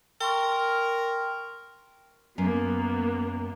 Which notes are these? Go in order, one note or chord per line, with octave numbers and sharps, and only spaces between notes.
A#4 G5 C6 C#6
F#2 A#3 B3